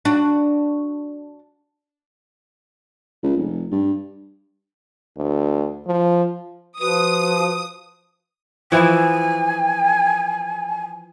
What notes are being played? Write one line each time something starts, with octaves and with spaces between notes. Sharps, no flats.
D4 F#4
C#2
F1
G2
D2
F3
F3 F#4 B4 D#6
E3 F3 E4 G#5